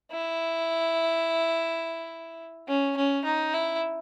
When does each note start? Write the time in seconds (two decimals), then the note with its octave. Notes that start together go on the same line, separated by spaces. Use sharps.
0.12 E4
2.68 C#4
2.97 C#4
3.25 D#4
3.54 E4